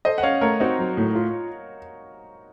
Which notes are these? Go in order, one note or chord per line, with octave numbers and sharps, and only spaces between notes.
A4 C5 D#5
F#5
C#4 C#5 F5
A3 A#4 C#5
C4 D#4 F#4
F#3
A2
F4